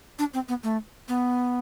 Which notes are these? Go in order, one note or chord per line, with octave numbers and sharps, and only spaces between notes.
D4
C4
B3
A3
B3